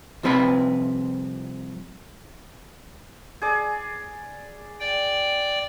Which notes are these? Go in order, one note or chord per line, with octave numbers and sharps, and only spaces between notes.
C2 F3 C4 B4 B5
G#4 D5
D5 G5